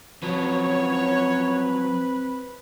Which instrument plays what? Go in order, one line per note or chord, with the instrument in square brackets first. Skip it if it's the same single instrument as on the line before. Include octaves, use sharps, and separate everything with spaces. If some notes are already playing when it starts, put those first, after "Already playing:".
[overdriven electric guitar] F3 F#3 [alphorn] C4 [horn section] C#4 F#4 C#5 [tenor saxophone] B4